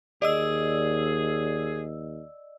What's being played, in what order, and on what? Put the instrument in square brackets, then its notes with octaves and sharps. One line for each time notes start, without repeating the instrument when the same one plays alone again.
[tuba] D#2 [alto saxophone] G#4 [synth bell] D5 D#5 E6